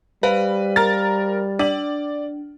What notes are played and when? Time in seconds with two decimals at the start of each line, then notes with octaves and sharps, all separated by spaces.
0.23 G3 B4 C5 F5
0.76 A#4 F6 A6
1.59 D4 D5 F#7